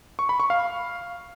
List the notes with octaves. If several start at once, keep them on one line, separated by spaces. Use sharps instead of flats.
C#6
B5
C#6
F5